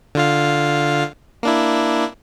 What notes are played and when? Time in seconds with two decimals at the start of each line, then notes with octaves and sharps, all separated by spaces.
0.15 D3 F4 F5
1.43 A#3 D4 E4